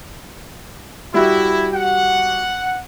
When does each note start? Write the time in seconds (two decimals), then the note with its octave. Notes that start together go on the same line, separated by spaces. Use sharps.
1.14 G3 E4 F#4 G4
1.74 F#5